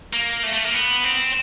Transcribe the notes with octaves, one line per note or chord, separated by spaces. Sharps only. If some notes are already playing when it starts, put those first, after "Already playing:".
A#3
A3
A3
A#3
B3
C4